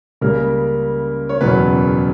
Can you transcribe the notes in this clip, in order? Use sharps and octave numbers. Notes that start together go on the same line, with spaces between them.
C#2 C#3 G3 A#3 A#4
C#5
F#1 E2 B2 F#3 B4